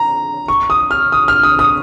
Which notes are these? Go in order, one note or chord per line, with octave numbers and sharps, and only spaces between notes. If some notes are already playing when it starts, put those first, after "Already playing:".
Already playing: A#5
C#6
D#6
F6
D#6
F6
D#6
D#6